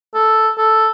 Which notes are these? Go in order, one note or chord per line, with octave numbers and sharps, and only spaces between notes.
A4
A4